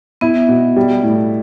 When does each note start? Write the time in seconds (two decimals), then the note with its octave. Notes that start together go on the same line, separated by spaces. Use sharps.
0.21 B3 E4
0.49 B2
0.76 G3
1.03 A2